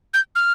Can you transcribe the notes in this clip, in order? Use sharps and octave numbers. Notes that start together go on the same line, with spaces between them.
G6
F6